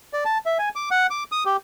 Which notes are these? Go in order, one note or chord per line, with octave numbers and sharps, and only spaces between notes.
D5
A5
E5
G#5
D6
F#5
D6
D#6
G4